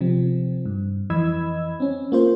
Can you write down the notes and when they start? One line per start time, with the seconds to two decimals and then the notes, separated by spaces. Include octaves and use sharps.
0.01 C3 F3 C4
0.65 G2
1.10 F2 E3 D#5 B5 E6 G#6
1.80 C4 C#4
2.12 A#3 F4 C5